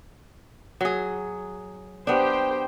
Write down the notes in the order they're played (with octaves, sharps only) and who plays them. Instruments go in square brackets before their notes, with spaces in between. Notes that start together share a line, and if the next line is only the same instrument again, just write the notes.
[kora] F#3 G#4
[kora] B3 D4 [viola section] G4 C5 G5